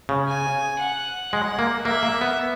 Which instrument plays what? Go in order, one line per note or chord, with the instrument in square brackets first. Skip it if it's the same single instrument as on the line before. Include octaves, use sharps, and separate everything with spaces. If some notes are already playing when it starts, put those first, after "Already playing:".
[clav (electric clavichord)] C#3
[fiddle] G#5
F#5
[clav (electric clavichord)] G#3 [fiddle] F#5
[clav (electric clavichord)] A#3
[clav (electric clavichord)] A#3 [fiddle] E5
[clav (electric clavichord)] A#3
B3